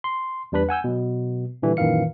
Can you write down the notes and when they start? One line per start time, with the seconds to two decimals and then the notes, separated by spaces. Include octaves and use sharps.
0.04 C6
0.52 E2 G3 D4 B4 B5
0.69 F#5 G#5 E6 G6
0.84 B2 F#3
1.62 A#2 D3 E3 G3
1.77 F#2 A#2 D#3 E3 F5 C#7